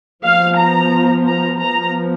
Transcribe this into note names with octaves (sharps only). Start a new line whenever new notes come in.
F3 B3 F5
A#5
A#5
F3 B3 A#5